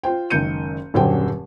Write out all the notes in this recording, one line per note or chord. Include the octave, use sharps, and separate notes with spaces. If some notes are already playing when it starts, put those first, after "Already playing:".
F4 C5 G5
F#1 C#2 D#3 G6 C#7 D#7
D#1 F#2 D3 F#3 C5 G5